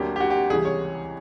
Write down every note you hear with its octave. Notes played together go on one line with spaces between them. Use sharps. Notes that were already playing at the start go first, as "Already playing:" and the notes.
Already playing: D2 D3 F#3 A#3 G4
G4
F#4
G4
C#2 C3 E3 G3 G#4
C#5